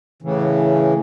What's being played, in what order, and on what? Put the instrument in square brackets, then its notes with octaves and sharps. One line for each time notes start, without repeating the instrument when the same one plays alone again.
[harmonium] A2 C#3 E3